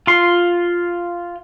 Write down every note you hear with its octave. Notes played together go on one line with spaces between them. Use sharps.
F4 C6